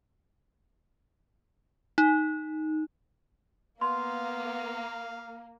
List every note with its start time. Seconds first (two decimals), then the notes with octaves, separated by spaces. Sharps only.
1.98 D#4
3.81 A#3 B3 F5 C6